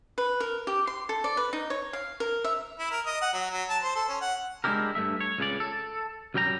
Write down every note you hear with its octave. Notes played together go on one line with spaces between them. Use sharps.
B4
A#4
G4
C6
A4
D5
B4
D#4
C#5
F5
A#4
E5
E4
A#4
D#5
F#5
F#3
F#3
A5
C5
A4
C#4
F#5
G#3 C#4 D4 E4 G4 A#4
G2 C3 A3 E5
C#5
C#2 C#3 D5
A4
F#2 F#3 G3 G5 A#5